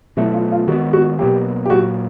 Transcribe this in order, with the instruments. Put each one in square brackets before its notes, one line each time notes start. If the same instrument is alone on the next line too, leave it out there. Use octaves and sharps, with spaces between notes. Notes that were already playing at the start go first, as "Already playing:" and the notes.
[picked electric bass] B2 F#3 A3 [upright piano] E4
[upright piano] F4
F4
[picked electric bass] D#3 G#3 B3 [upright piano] F#4
[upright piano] F#4
[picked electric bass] B2 F#3 A#3 [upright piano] G4
[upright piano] G4
[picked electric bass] A#2 F#3 A#3 [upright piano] F#4